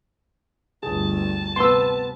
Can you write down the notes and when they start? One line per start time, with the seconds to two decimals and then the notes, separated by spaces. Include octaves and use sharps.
0.83 G1 D2 G#4 A5
1.56 C3 B3 B4 C6 E6